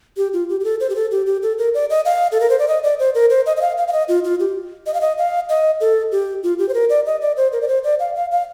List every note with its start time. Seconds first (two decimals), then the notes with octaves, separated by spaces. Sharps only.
0.17 G4
0.33 F4
0.49 G4
0.60 G4
0.64 A4
0.80 C5
0.90 G4
0.96 A4
1.11 G4
1.26 G4
1.43 A4
1.58 A#4
1.74 D5
1.90 D#5
2.05 F5
2.32 A4
2.40 A#4
2.50 C5
2.59 D5
2.68 D#5
2.83 D5
2.99 C5
3.15 A#4
3.30 C5
3.46 D#5
3.57 D#5
3.61 F5
3.78 F5
3.88 F5
3.93 D#5
4.08 F4
4.24 F4
4.40 G4
4.86 D#5
4.94 F5
5.01 D#5
5.18 F5
5.49 D#5
5.81 A4
6.12 G4
6.43 F4
6.59 G4
6.69 C5
6.74 A#4
6.90 D5
7.06 D#5
7.21 D5
7.37 C5
7.52 A#4
7.61 D5
7.68 C5
7.84 D5
8.00 F5
8.15 F5
8.31 F5